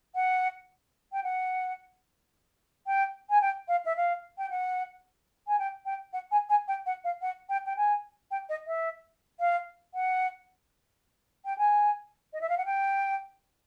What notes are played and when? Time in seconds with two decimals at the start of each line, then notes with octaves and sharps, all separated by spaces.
0.15 F#5
1.12 G5
1.23 F#5
2.87 G5
3.29 G#5
3.41 G5
3.68 F5
3.85 E5
3.96 F5
4.38 G5
4.50 F#5
5.47 G#5
5.59 G5
5.85 G5
6.13 F#5
6.31 G#5
6.49 G#5
6.68 G5
6.86 F#5
7.04 F5
7.21 F#5
7.49 G5
7.66 G5
7.76 G#5
8.31 G5
8.49 D#5
8.67 E5
9.40 F5
9.94 F#5
11.45 G5
11.57 G#5
12.33 D#5
12.41 E5
12.49 F5
12.57 F#5
12.65 G5